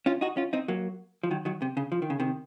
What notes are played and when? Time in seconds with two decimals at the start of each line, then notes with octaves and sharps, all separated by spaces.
0.06 C#4 F4
0.21 D#4 F#4
0.37 C#4 F4
0.53 C4 D#4
0.68 F#3 A#3
1.23 F3
1.31 D#3 F#3
1.45 D#3 F#3
1.62 C3
1.77 C#3
1.92 F3
2.02 D#3
2.10 C#3
2.20 C3 D#3